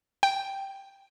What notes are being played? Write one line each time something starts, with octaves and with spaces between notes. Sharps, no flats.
G5